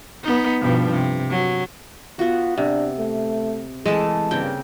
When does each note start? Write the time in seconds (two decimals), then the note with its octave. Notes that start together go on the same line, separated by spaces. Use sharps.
0.23 B3 D#4
0.61 G2 B2 F3
0.91 C3
1.30 F#3
2.19 B3 F4 F#4
2.58 C3 D4
2.99 A3
3.86 E3 G#3 A3 G#4 A5
4.31 G2 C#3 A#3 C4 G5